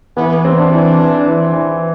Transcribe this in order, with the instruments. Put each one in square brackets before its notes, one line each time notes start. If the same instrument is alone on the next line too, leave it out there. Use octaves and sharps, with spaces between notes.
[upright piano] E3 [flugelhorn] B3
[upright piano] C4
[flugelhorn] D4
[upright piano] E3
E3
E3
E3